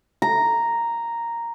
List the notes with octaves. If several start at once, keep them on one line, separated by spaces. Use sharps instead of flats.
A#5